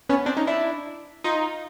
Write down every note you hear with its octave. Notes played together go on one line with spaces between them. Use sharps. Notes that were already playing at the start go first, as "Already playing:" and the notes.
B3 C#4
C4 D4
C#4 D#4
D4 E4
D#4 F4